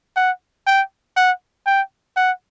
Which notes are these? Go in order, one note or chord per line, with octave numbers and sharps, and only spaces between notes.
F#5
G5
F#5
G5
F#5